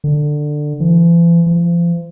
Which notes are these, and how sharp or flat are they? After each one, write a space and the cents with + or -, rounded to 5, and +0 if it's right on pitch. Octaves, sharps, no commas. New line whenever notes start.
D3 +15
E3 +45
F3 -35